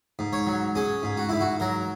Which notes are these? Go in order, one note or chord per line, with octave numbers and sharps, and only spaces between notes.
G#2
C#5
F#3
C#4 G#4
G#2
F#4
G#2 E4
F#4
F#3 A#4